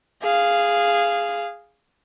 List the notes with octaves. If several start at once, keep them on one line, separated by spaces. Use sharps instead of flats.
G#4 F5